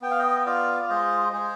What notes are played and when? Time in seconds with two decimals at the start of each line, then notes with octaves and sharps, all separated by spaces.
0.02 B3 G5
0.11 F5
0.19 D#5 G5
0.40 D#5
0.45 F4 D5 F5
0.82 F5
0.89 G#3 C5 D#5
1.33 G#3 G#4 C5